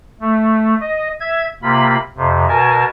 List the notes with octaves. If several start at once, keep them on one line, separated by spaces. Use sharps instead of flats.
A3
D#5
E5 G#6
C3 A#3 F4 B5
F2 C3
B2 A#4 G#5 A5